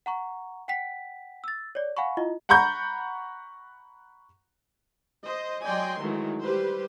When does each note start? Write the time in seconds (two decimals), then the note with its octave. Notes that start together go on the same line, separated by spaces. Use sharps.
0.06 F#5 A#5 C#6
0.68 F#5 G5 B6
1.44 E6 A6
1.75 C#5 D5
1.97 F5 F#5 G#5 B5 C#6
2.17 E4 F4 D#5
2.49 F#5 A#5 B5 C#6 G6
5.25 C5 D#5
5.65 F#3 D5 D#5 G5 G#5 C6
6.01 D#3 E3 F#3 G#3 A3
6.42 G3 G4 B4 C5